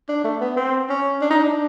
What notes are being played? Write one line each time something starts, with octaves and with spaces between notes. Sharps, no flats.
D4
A3
B3
C4
C#4
D4
D#4
D4